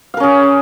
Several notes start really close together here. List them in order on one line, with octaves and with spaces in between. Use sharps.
F5 A#4 C#4 G#4